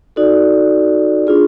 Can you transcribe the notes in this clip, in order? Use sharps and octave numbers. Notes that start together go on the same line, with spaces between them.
D#4 F#4 A4 D5
D4 F4 G#4